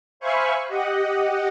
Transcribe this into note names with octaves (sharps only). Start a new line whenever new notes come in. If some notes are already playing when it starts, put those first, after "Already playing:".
C5 E5 F5 G#5 B5 C#6
G4 D#5 F#5